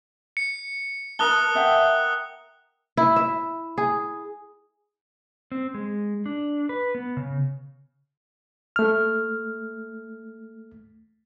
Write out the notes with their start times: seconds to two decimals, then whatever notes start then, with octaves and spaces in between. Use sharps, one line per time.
0.37 C#7
1.19 A#4 A5 D#6 F#6 G7
1.55 E5 F#5 G5
2.97 E4
3.16 E5
3.78 G#4
5.52 C4
5.74 G#3
6.26 D4
6.69 B4
6.95 B3
7.17 C#3
8.76 A3 F6